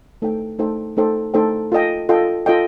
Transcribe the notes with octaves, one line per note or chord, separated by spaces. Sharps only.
A3 D#4 A4 C5 G5
A3 D#4 A4 C5 G5
A3 D#4 A4 C5 G5
A3 D#4 A4 C5 G5
F4 A4 D#5 G5
F4 A4 D#5 G5
F4 A4 D#5 G5